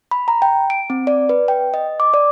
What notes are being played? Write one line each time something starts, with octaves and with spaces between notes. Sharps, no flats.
B5
A#5
G5
D7
C4
D5
B4
G5
D#5
D6
D5